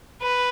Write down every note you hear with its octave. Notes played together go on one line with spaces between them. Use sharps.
B4